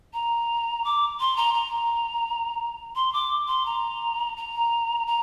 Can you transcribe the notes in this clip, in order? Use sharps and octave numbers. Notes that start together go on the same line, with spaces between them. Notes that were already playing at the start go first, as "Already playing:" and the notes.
A#5
D6
C6
A#5
A#5
C6
D6
C6
A#5
A#5
A#5